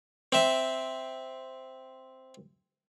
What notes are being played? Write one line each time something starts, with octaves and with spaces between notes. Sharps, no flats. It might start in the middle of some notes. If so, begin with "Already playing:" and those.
C4 E5